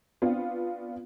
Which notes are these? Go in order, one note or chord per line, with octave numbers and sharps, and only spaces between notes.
B3 C4 D4 F4 F5